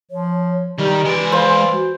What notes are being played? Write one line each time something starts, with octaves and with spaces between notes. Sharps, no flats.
F3 C#5
D#3 G3 G4
E3 G#3 D5
C5 F5
F#4